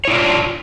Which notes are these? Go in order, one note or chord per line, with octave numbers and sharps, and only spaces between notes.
D4 E4 F4 C#5 D5